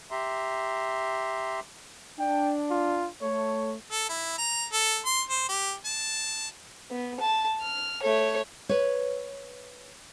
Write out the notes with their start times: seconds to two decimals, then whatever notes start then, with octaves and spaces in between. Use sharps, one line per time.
0.11 G4 E5 A#5 C6
2.19 D4 G5
2.70 F4
3.22 A3 C#5
3.91 A4
4.09 E4
4.38 A#5
4.73 A4
5.06 C6
5.30 C5
5.49 G4
5.85 A5
6.90 B3
7.20 A5
7.61 F6
8.02 A3 C#5
8.69 B4 C#5